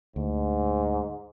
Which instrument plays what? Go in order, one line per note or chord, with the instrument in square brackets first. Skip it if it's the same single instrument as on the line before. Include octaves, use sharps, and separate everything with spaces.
[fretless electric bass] D2 [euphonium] G#2